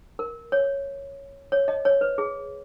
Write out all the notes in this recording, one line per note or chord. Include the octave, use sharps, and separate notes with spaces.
A#4
C#5
C#5
D#5
C#5
B4
G#4